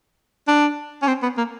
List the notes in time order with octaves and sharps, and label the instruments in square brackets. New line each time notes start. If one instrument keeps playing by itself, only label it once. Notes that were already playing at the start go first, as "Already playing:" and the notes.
[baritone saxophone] D4
C#4
C4
B3
A#3